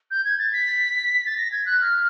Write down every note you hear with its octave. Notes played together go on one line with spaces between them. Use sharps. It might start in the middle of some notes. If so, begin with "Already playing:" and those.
G6
G#6
A6
B6
A6
A#6
G#6
F#6
F6